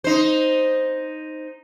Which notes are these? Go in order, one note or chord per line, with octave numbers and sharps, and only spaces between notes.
D#4 C5